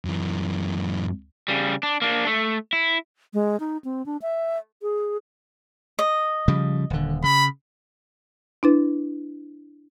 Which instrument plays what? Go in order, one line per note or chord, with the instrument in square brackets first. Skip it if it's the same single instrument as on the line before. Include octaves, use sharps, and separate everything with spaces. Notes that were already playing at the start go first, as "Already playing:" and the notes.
[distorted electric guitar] F#2 E3
[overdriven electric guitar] C#3 G3
D4
A#3 D4
A3
E4
[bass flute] G#3
D#4
C4
D4
E5
G#4
[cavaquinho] D#5
[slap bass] C#3 F3 G3
D#1 D3
[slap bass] C#3 [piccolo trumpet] B5
[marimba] D4 E4 B4